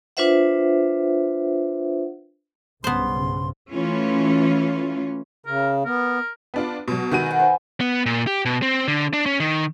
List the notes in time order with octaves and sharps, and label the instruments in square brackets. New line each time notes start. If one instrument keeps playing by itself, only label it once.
[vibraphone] D4 F4 B4 C5 E5 F#5
[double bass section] B1 G2 C#3 [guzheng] B3 C5 [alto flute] C6
[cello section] E3 A3 C#4 F4
[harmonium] C#3 [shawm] A#4
[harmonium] B3 [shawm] A#4
[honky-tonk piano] B3 D4 F4
B2 F#3
[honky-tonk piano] D#3 F#4 D#7 [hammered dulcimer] B4 E5 G#5
[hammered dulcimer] F#5 G#5
C5
[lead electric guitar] B3
A#2
G4
B2
C4
D3
D4
C#4
D#3